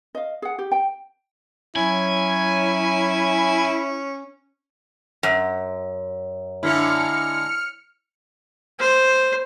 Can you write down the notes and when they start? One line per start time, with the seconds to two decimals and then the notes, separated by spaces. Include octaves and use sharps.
0.15 D#5 F5
0.42 G#4 F#5
0.59 G4
0.72 G5
1.76 F#3 C#4 E4 G#5
5.23 F#2
6.63 D3 G#3 A#3 E4 F6 C#7
8.79 C5